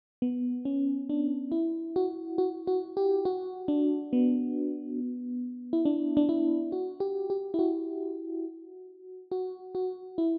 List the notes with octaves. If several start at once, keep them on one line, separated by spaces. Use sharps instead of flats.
B3
C#4
D4
E4
F#4
F#4
F#4
G4
F#4
D4
B3
E4
D4
D4
E4
F#4
G4
G4
E4
F#4
F#4
F#4
E4